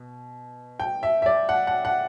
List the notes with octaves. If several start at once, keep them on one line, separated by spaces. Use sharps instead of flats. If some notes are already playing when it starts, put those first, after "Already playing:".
Already playing: B2
G5
E5
E5
D5
F#5
F#5
F#5